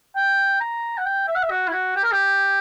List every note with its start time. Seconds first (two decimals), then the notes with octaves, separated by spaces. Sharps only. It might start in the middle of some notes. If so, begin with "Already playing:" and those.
0.16 G5
0.60 A#5
0.97 F#5
1.06 G5
1.28 E5
1.35 F#5
1.42 E5
1.50 F#4
1.68 E4
1.73 F#4
1.95 G4
2.04 A#4
2.12 G4